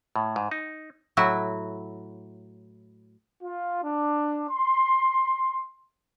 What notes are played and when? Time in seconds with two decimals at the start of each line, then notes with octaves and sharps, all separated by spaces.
0.16 A2
0.36 G#2
0.51 D#4
1.17 A2 F#3 E4 F#4
3.42 F4
3.83 D4
4.49 C6